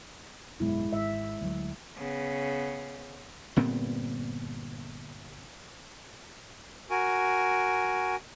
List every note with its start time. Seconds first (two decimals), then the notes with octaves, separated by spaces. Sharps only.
0.60 G#1 F#2 B2 G#3 E4
0.93 G#1 E5
1.41 D2 F#3
1.97 C#3 B3
3.56 G1 A#2 B3 C4
6.90 F#4 A#4 G#5